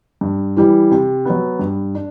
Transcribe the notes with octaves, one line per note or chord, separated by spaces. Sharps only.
G2
E3 G3
C3
F#3 B3
G2
D4